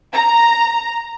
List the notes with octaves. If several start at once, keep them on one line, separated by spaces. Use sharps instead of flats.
A#5